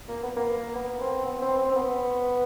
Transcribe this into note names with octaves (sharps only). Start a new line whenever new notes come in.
A#3
B3
A#3
B3
C4
B3
C4
C4
C4
B3